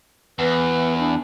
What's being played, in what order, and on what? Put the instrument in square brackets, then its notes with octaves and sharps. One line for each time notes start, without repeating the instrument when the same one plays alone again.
[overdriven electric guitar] E2 [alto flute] B4
[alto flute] D4